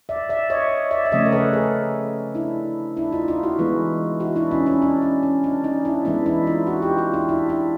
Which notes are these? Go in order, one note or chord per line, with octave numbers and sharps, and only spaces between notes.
D5 E5
D5 E5
C#5 D#5
D5 E5
E5
C#3 F3 A3 C4 C#5 D#5
A#4
A4 B4
G#4 A#4
D4 E4
D4 E4
D#4 F4
D#4 F4
E4 F#4
E3 G#3 B3
E4 F#4
D4 E4
C#4 D#4
C#4 D#4
D4
C#4
C#4
D4
C#4 D#4
D4 E4
E3 G#3 B3 D4 E4
D4 E4
D#4 F4
E4 F#4
F4 G4
D#4 F4
D4 E4
D4 E4
D4 E4